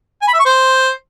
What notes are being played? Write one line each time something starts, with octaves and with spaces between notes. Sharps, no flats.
G#5
B5
E5
C#6
C5